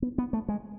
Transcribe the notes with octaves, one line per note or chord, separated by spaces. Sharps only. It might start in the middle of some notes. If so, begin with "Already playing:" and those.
B3
B3
A3
G#3